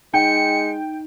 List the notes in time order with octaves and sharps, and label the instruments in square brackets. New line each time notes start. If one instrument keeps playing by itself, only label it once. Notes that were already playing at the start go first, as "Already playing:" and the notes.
[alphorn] G#3 [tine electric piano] D#4 [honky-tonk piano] G5 [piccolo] C#7